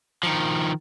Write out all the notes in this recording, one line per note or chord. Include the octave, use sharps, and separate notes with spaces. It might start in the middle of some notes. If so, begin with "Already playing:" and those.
D#3 F3